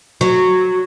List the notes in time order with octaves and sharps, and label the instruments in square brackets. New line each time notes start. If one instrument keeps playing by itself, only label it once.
[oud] F#3